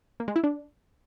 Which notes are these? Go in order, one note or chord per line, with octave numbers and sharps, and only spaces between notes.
A#3
G#3
E4
D4